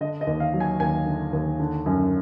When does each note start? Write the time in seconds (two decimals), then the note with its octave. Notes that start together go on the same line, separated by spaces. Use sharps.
0.01 D3 D#5
0.21 D#5
0.27 D#2
0.40 F5
0.54 F#3
0.60 G#5
0.80 D#2 G#5
1.06 D3
1.33 D#2
1.59 D3
1.86 F#2